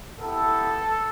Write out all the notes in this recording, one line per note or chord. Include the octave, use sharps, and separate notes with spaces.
B3 E4 G4 A4